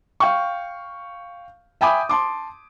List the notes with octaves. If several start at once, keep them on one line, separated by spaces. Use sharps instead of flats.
F5 G5 C#6
E5 G5 G#5 B5 D6 D#6
A5 C6 D6